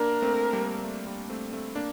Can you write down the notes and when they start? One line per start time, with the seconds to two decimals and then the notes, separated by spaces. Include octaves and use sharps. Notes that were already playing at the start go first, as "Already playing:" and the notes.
Already playing: A#3 D4 A#4
0.22 A3 C4
0.53 G3 A#3
0.84 A3 C4
1.07 G3 A#3
1.30 A3 C4
1.52 A3 C4
1.75 A#3 D4